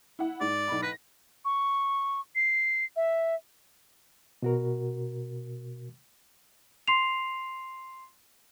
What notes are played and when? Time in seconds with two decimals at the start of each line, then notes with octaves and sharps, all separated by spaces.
0.19 E4 F#5
0.41 G#2 D5
0.68 B1 B5
0.82 B4 A#6
1.45 C#6
2.35 C7
2.96 E5
4.42 B2 F#4 A#4
6.88 C6 C7 F7